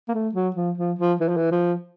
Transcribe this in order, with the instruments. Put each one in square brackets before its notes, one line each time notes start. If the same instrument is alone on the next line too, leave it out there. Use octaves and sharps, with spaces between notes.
[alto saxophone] A#3
A3
F#3
F3
F3
F3
E3
F3
E3
F3